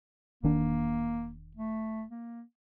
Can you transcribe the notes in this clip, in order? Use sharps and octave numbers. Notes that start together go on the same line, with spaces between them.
E1 D#3 A#3 D4
A3
A#3